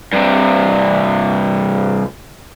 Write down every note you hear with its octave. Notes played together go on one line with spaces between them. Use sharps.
G2 C3